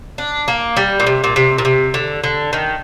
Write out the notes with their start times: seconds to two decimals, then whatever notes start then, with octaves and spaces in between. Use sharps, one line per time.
0.18 D4
0.48 A#3
0.77 G3
1.00 A#2
1.07 C3
1.24 A#2
1.36 C3
1.58 A#2
1.65 C3
1.94 D3
2.24 D3
2.53 D#3